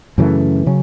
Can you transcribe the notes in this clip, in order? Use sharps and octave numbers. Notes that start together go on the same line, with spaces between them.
F#2 C#3 E3 A3
C#3 F#3 C#4